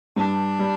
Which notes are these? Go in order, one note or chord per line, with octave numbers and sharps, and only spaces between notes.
G2 D4
G3